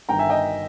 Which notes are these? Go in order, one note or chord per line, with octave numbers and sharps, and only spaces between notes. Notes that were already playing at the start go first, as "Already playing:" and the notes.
G1 G2 D#3 G5 A#5
E5 G#5
D#5 G5